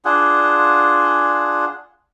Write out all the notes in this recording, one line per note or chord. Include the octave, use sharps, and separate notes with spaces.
D4 F4 G#4 F#5